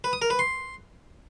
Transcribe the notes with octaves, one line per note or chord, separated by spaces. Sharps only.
B4
D#6
A#4
B4
C6